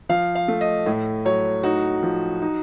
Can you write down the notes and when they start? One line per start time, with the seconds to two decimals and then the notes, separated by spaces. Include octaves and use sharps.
0.09 F3 F5
0.35 F5
0.48 A3
0.61 D#5
0.86 A2
1.25 F#3 C#5
1.63 D#4 F#4
2.03 F3
2.42 D#4